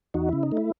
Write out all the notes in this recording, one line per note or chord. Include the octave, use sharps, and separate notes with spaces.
E2 D#4 F#4
C#3 E4
D#4
A3
E4